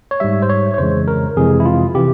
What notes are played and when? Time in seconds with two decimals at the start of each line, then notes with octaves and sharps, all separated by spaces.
0.11 C#5
0.20 G#2 G3 E5
0.42 C5
0.50 C#5
0.74 C#5
0.78 F2 C#3 E3 G#3 C5
1.08 A#4
1.36 F2 C3 E3 G#3 G#4
1.60 E4
1.65 F4
1.95 C3 E3 G4